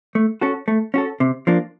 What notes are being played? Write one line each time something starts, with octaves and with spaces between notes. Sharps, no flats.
A3
C#4 F#4 A4
A3
C#4 F#4 A4
C3
F3 A#3 D4